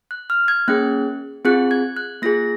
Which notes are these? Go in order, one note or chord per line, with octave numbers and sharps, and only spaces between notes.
F#6
F6
G#6
A#3 C#4 G#4 F#6
C4 F4 G#4 F#6
G#6
F#6
A#3 F4 G#4 A#6